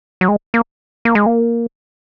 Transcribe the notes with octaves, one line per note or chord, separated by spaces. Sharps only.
F#3
G#3
A#3
A#3
G#3
A#3